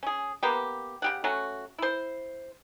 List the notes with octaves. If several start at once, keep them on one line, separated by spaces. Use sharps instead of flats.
C#4 G#4
A#3 B3 G4
C#3 G4 F#5
F#3 A3 C#4 F#4
E4 C5